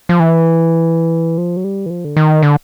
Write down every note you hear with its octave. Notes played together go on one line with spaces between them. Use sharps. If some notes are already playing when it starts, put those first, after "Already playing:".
F3
E3
F3
F#3
G3
E3
F3
D3
D#3
D3